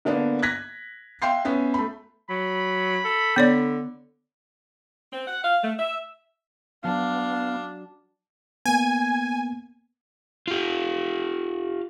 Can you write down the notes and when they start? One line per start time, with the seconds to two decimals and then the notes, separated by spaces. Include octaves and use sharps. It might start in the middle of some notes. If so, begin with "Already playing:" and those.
0.05 D3 A#3 B3 D4
0.42 F#6 G#6 A#6 B6
1.22 E5 F5 G5 C6 G6 C7
1.45 B3 C#4 E5
1.74 A3 B5
2.30 F#3 B5
3.05 A4
3.36 D3 B3 C#5 D5
5.13 C4
5.27 F#5
5.44 F5
5.63 A3
5.79 E5
6.84 F#3 B3 D4 F5 A5
8.66 A#3 B3 G#5
10.48 F4 G4